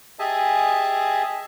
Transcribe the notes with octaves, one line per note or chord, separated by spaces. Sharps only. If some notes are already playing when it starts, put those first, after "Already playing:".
G4 G#4 D#5 E5 G#5 A5